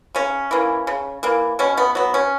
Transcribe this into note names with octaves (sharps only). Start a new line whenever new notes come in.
C#3 C#4
E3 A#3
C#3
E3 A#3
B2 C#4
B3
F#3 B3
C#4